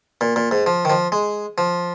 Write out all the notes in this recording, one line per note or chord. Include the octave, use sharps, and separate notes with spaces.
A#2
A#2
G#2
F3
D#3
F3
G#3
F3